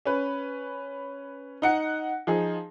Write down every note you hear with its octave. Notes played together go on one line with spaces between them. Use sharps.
C#4 B4
D#4 F#5 C#7
F3 D#4 G#4